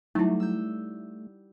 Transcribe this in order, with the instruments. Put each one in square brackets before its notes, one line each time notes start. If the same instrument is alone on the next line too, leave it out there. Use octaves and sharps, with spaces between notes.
[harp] F#3 G3 [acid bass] A3 [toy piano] D#4 E4
[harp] E6 G6